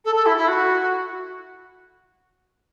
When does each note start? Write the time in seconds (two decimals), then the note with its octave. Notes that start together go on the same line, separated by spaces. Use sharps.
0.05 A4
0.15 A4
0.26 E4
0.37 E4
0.48 F#4